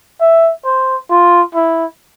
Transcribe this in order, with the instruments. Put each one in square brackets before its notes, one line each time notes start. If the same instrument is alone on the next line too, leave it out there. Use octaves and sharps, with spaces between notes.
[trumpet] E5
C5
F4
E4